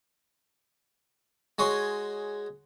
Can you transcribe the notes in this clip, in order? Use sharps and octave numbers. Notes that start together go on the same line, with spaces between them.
G#3 F#4 C#5 G#5 C6 C#6